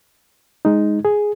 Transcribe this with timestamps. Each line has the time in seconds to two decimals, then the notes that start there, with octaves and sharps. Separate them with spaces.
0.65 G#3 D#4
1.05 G#4